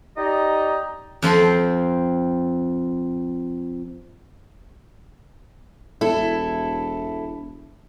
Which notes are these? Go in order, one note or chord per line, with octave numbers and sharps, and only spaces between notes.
D#4 G4 D5 D#5 G5 A#5
F2 F3 C4 C6
E1 E4 A4